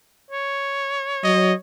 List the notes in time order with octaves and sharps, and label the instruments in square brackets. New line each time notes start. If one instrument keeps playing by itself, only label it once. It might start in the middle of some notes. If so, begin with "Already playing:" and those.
[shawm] C#5
[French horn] F#3 [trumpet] D#5